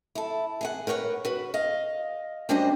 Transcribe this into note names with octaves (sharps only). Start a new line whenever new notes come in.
E4 A4
G#4 D#5 F#5
A#4 B4 C#5 D5 F#5
F#4 B4
D#5 F5
G3 C#4 D4 F#4 C5 D#5